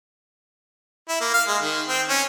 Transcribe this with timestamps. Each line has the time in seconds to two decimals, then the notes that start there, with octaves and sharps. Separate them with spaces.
1.09 E4
1.20 A#3
1.34 F5
1.48 G#3
1.62 D#3
1.88 C4
2.09 C#4